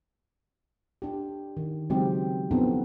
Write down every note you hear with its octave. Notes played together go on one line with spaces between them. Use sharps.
D4 G4
D#3
C#3 F#3 G#3 C4 D#4 G4
F3 B3 C4 D4 D#4 A4